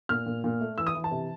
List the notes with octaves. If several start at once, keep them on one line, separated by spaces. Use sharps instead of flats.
A#2 F6
A#2
A#2
A3
E3 E6
D#6
E3
A5
C3